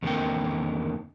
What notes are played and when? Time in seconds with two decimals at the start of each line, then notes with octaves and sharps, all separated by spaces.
0.02 E2 D3 D#3 A#3 C4 G5